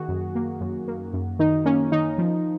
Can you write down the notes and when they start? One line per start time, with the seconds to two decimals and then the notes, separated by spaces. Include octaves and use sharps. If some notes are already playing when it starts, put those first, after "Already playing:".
Already playing: D#3 A#3 F#4 G#4
0.08 F#2
0.35 A#3
0.61 F#2
0.88 A#3
1.13 F#2
1.39 D#3 D#4
1.66 A#3 C#4
1.92 D#3 D#4
2.18 F3